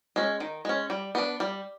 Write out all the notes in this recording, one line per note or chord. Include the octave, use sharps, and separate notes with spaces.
G#3 C#4
D#3
G#3 C#4
G3
B3 D4
G3